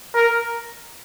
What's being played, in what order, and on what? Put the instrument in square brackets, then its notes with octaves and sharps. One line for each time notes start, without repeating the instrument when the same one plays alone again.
[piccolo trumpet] A#4